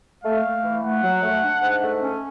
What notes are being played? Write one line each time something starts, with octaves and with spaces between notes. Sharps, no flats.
A3 F5
A3
E3
A3 F#5
F#3
A3
D4
G#2
A3
C#4